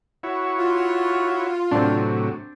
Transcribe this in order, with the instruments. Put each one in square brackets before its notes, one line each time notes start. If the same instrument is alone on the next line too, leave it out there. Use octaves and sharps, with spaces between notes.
[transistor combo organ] E4 F#4 C#5
[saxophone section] F4
[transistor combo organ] A2 C3 F#3 [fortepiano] C4 D4